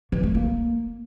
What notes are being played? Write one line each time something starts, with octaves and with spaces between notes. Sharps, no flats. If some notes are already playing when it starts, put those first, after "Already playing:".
E3
A3
A#3